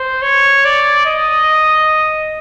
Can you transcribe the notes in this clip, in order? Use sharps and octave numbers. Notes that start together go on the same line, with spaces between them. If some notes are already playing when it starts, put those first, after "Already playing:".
Already playing: C5
C#5
D5
D#5